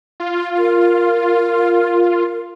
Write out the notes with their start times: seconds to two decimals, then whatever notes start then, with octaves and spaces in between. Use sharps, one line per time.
0.20 F4
0.58 A#4